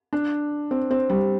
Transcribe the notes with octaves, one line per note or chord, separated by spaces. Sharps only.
D4
C4
C4
G3